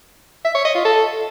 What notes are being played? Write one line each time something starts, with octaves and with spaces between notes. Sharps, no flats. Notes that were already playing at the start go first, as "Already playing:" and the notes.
E5
C#5
D#5
F4
A4